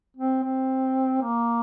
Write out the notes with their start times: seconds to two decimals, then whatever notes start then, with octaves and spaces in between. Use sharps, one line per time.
0.17 C4
0.43 C4
1.22 A#3